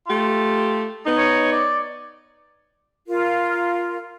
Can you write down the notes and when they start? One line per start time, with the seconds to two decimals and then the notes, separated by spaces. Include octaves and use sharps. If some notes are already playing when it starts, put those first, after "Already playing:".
0.07 A3 F4 G4
1.04 B3 D#4
1.17 C#5
1.52 D5
3.07 F4 A#4